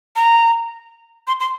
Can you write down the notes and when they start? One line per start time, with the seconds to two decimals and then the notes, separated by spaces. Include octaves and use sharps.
0.16 A#5
1.27 C6
1.40 C6